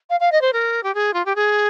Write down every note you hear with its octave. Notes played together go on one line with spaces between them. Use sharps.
F5
F5
D#5
C5
A#4
G4
G#4
F4
G4
G#4